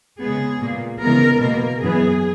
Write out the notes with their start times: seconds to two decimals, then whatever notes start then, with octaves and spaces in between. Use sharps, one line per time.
0.21 C#3 G#3 B3 G#4
0.61 A#2 A#3
1.01 C#3 E3 G#3 B3 A#4
1.41 B2 A#3 A#4
1.81 F#2 E3 B3 G#4